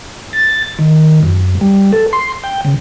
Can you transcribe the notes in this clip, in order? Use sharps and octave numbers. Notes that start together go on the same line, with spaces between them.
A6
D#3
F#2
G3
A4
C6
G5
C#3